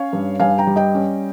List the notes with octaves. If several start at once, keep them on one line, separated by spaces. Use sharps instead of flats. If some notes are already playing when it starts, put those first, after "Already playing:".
Already playing: C#4 C#5 F5
G2
G2 F5 G#5
G5 A#5
G3
D#5 G5
C#4